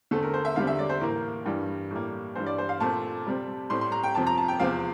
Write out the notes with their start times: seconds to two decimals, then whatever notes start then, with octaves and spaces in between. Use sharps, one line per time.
0.11 E2 D3 A3 C4 A4
0.22 A#4
0.34 C5
0.45 E5
0.56 E2 D3 G3 C4 F5
0.67 E5
0.79 D5
0.89 C5
1.01 A2 E3 A#3 A#4
1.45 G2 E3 G3
1.91 A2 G3 A#3
2.35 G2 E3 G3 C5
2.46 D5
2.58 C5
2.69 F5
2.80 A#2 A3 C4 A5
3.25 C3 G3 C4
3.70 A2 G3 C4 C6
3.81 C6
3.92 A#5
4.03 G5
4.15 F2 C3 F3 C4 A5
4.27 A#5
4.38 A5
4.48 G5
4.59 E2 C3 F3 C4 F5